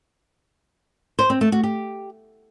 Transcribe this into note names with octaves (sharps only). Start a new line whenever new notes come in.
C5
C4
A3
F#4
G4